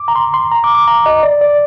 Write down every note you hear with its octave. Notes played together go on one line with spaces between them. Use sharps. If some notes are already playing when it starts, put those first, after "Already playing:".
Already playing: D6
A#5
C6
C6
A#5
D6
D6
A#5
D#5
D5
D5